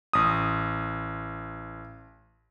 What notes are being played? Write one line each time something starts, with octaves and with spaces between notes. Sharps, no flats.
A1 D#6